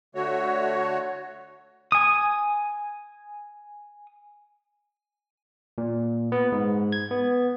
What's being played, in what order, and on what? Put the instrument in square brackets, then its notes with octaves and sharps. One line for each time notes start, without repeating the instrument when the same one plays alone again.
[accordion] D3 A3 F#4 C#5
[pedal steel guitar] G#5 D#6
[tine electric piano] A#2
B3
G#2
G#6
B3